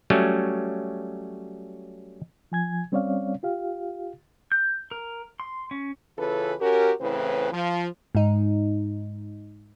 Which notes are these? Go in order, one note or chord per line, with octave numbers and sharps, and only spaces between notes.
F#3 G3 A3 C#4
F3 G#5 G#6
G3 C4 C#4 C#5 D5 F5
F4 G4 F5
G6
A#4
C6
C#4
C#3 E3 C#4 F4 A4 B4
C#4 F#4 G4 A#4
A2 C#3 E3 C4 B4
F3
G#2 D#4